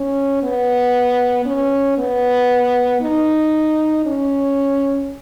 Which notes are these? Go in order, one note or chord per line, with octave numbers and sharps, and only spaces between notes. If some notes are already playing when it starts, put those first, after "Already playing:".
Already playing: C#4
B3
C#4
B3
D#4
C#4